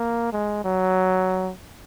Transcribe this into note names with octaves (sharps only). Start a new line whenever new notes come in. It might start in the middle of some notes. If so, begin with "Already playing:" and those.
Already playing: A#3
G#3
F#3